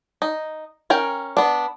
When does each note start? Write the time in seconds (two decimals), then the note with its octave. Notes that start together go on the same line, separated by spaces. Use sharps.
0.22 D#4
0.90 C#4 A#4 G5
1.37 B3 D4